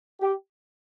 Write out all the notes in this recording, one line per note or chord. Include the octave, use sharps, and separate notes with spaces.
G4